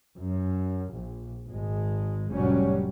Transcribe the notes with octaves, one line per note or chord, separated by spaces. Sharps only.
F#2
A#1
G#1 G#3
F1 A2 F#3 G3 C#4